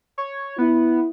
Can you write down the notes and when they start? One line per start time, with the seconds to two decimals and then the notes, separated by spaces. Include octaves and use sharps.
0.18 C#5
0.58 B3 E4